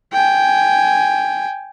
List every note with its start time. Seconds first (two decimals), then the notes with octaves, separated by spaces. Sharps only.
0.13 G5 G#5